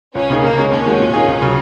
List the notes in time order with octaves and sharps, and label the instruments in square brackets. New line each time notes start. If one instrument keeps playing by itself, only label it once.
[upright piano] C#2 [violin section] C#4
[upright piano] C#3 A#3 D#4 G#4
[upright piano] C#3 [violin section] A#3
[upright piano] G#3 C#4
[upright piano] D#2 [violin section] C#4
[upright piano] D#3 G#3 F#4
A#2
A#3 D#4 G#4
C#2
C#3 F#3